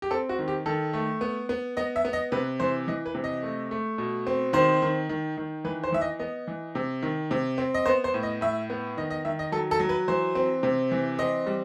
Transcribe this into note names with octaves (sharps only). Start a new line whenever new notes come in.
G4
C4 A4
F#4
D#3
G4
D#3 A4
A3
B3
B3
B3 D#5
E5
B3
D#5
C3 B4
E3 C5
E3 D#5
B4
C3
D#5
A3
A3
B2
C4
D#3 C5
D#3
D#3
D#3
E3 B4
C5
E3 E5
D#5
B3 D#5
E3
C3
D#3
C3
C4
D#5
B3 C5
C5
A2
D#5
A2 E5
B3
D#3 D#5
D#5
D#3 E5
D#5
F#3 A4
A4
F#3
B4
E3 C5
C4
C3
E3
C4 D#5
G3